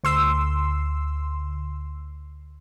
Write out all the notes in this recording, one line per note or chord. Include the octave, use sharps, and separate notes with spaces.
D2 C6 E6